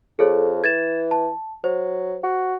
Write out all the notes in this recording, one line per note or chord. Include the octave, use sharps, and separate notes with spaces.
F2 G#4 A4 C#5
E3 G#6 A6 E7
A5
F#3 C5
F#4